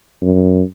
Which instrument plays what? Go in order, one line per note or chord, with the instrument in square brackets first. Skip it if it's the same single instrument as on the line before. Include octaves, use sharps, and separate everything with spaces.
[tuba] F#2